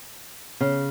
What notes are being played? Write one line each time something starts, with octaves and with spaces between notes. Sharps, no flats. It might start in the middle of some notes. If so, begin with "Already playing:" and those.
C#3